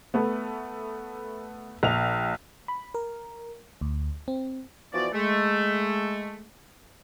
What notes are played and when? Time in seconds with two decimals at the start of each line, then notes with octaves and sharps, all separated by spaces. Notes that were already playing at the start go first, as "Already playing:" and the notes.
0.14 A3 B3
1.83 A#1 F7
2.68 B5
2.95 A#4
3.81 D2
4.28 C4
4.93 E3 F3 B3 F#4 D5
5.13 G#3 A3